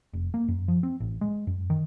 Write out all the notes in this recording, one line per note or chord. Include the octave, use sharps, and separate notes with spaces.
F1
A#3
F#2
F3
C4
A1
G#3
F#2
D#3